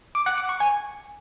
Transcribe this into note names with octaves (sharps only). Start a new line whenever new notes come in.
D6
F#5
D6
C#6
G#5